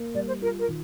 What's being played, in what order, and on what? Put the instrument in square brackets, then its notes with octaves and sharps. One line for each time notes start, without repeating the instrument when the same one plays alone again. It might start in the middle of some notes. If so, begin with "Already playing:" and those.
Already playing: [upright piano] A#3
[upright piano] G3 [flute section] D5
[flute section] C5
[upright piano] F4 [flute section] A#4
[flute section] A#4
[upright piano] D#3